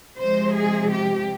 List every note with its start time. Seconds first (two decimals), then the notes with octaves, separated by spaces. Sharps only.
0.18 C3 F3 G#3 C5
0.55 G#4
0.92 G4